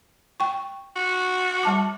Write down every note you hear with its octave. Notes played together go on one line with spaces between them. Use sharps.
G5 C#6
F#4
G3 A5 D6